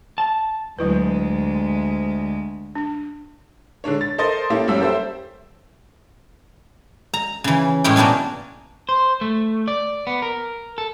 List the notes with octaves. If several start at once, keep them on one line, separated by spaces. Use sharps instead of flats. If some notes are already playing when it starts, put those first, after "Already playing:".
A5
D2 F#3 G#3 E4 B4
D4
D3 G#3 D4 C#5
A6
A4 A#4 C5 D#5 C6 A6
A#3 C#4 E4 G4 A4
F#1 F#2 G3 C#4 E6
G4 A4 C5 E5
A#5
C#3 E3
A2 G#3 C#4 E4 G5
B2 A#3 B3 D4 G#5
C5
A3
D5
B3
A#4
A4